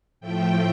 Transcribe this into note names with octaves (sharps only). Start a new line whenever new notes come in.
A2 F3 A3 G5